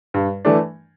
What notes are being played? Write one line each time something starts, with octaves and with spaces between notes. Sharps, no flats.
G2
E3 A3 D4